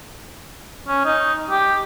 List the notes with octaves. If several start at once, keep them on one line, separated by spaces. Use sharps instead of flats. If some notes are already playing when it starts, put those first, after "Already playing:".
C#4
D#4
G4